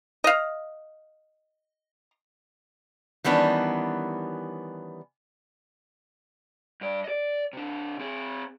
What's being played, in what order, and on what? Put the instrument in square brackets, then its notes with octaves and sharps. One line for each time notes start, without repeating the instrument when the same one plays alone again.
[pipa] D#5 F5
[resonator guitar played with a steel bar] D#3 E3 G3 B3 C#4 D4
[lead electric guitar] G2 D5
D5 D#5
C3 D4
C4 G#4